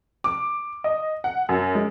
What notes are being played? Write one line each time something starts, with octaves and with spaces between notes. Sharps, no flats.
D6
D#5
F#5
F#2
G#3